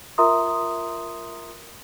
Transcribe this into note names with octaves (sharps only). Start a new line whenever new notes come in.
F4 A#4 E5 A#5 C6 D#6